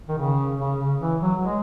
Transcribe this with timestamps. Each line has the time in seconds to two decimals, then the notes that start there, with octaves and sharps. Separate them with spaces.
0.08 D#3
0.18 C#3
0.59 C#3
0.79 C#3
1.00 E3
1.21 F#3
1.41 G#3